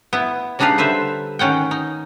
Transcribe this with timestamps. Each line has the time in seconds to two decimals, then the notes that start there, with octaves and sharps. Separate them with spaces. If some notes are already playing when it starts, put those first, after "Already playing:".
0.13 B3 E4
0.59 C#3 G3 D4 D#4 B4 F5
0.78 D3 B4 C5 E5
1.39 D#3 C#4 F#5 G5
1.71 D#4